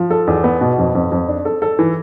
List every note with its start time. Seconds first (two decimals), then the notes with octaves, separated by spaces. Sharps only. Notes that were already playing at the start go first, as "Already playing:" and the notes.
Already playing: F3
0.11 A4
0.27 E2
0.44 B3
0.61 B2
0.78 F2
0.95 F2
1.12 F2
1.28 D4
1.45 A4
1.62 A4
1.79 E3